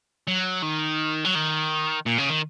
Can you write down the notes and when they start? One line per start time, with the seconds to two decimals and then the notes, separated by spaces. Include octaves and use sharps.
0.28 F#3
0.62 D#3
1.25 F#3
1.35 D#3
2.06 A#2
2.18 C#3
2.29 D#3